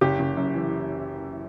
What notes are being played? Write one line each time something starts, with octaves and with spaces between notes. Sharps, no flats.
F#1 G4
F#1
F#2
E3